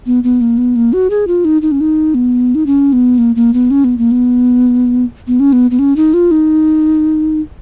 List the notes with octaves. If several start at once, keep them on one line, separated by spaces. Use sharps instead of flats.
B3
B3
A#3
B3
A#3
F#4
G#4
F4
D#4
D#4
C#4
D#4
B3
D#4
C#4
B3
A#3
A#3
B3
C#4
B3
A#3
B3
B3
C#4
B3
B3
C#4
D#4
F4
D#4